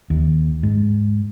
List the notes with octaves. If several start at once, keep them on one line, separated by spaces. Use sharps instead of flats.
D#2
G#2